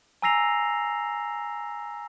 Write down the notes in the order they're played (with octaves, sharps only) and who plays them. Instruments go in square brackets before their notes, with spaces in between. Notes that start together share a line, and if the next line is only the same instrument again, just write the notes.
[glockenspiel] G#5 A#5 E6 A#6 C7 F7